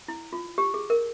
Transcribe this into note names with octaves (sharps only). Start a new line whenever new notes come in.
E4
F4
G4
G#4
A#4